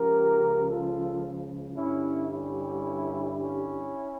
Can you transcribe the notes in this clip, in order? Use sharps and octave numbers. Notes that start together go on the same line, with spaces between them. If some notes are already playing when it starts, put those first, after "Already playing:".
Already playing: C#2 C#3 F3 G4 A#4
F4 A4
G2 D3 G3 C#4 E4
C#4 E4
C#4 E4